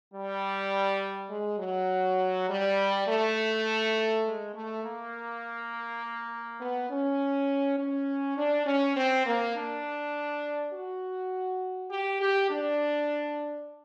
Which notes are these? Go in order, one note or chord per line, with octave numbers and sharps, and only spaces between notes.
G3
G#3
F#3
G3
A3
G#3
A3
A#3
B3
C#4
C#4
D4
C#4
C4
A#3
D4
F#4
G4
G4
D4